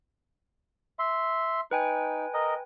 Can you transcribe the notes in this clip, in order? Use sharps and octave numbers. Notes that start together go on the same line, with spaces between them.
E5 C6
D#4 B4 G5 G#5
A#4 D#5